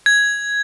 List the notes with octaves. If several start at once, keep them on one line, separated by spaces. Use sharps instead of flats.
G#6